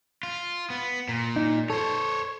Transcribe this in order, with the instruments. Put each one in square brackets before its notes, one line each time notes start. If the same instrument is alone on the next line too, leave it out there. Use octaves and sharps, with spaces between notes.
[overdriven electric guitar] F4
B3
A#2
[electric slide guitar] D#4
[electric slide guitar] A4 [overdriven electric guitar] C5 C#5